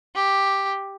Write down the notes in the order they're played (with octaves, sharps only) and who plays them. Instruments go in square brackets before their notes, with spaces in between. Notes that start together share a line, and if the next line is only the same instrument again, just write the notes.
[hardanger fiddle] G4